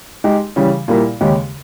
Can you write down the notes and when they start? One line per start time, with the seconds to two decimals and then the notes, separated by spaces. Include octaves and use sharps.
0.24 G#3 D#4 G4
0.56 C#3 E3 G3 C#4
0.88 A#2 G3 A#3 E4 A#4
1.21 D#2 C#3 G#3 C#4 G4